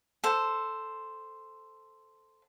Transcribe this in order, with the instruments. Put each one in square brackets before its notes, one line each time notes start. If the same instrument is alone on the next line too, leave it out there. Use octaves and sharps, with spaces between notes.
[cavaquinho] A4 C5